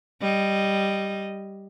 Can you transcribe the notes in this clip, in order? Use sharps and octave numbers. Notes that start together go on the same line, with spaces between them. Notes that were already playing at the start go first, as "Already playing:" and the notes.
G3 D#5